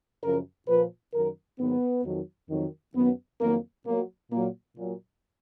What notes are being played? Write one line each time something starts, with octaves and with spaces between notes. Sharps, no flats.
F#2 C#3 F3 A#4
A#2 F3 B4
F#2 D#3 F#3 A#4
G#2 D#3 F#3 B3
F2 D#3 F#3
F2 D#3 F#3
F#2 D#3 F#3 B3
F2 D#3 F#3 A#3
A#2 F#3 A#3
A#2 F#3 A#3
A#2 F#3